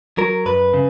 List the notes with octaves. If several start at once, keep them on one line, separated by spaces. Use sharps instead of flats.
F#3 A#4
F#2 B4
C#3